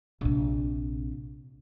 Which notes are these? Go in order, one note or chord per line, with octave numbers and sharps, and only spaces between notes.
A#1 C3